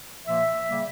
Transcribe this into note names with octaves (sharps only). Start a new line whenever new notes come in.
A#2 F3 A#3 E5
C#3 G3 A#3